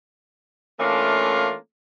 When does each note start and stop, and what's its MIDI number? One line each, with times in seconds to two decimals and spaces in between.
0.79 1.54 52
0.79 1.54 57
0.79 1.54 58
0.79 1.54 61
0.79 1.54 62
0.79 1.54 65